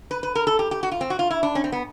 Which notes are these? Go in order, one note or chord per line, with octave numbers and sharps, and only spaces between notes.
B4
B4
A#4
A4
G4
G4
F#4
F4
C4
F#4
F4
E4
D4
C#4
C4
B3